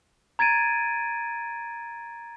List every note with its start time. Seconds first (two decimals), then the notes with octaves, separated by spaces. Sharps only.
0.39 A#5 G#6 A6 D7 D#7